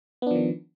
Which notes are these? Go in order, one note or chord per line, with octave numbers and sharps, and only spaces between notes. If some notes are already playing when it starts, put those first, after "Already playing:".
D#3 F3 B3 D4